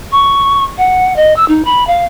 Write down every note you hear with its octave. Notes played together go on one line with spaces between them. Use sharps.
C#6
F#5
D#5
E6
D#4
B5
F5